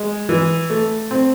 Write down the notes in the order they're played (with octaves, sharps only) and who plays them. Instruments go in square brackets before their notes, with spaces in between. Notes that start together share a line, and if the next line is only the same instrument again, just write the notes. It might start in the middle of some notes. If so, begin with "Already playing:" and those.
Already playing: [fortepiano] G#3
E3
A3
C4